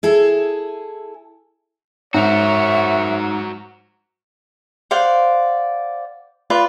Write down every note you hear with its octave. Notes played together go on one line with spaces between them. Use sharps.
E4 G#4 A4
G#2 F#4 A#4 C#5 E5 F#5
C5 D5 F5 F#5
F4 B4 D5